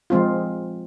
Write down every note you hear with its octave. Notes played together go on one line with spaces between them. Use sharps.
F3 G#3 C4 F4